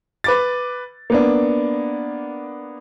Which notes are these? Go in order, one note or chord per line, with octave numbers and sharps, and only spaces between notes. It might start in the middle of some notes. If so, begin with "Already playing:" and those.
B4 D6 A6
A#3 B3 D4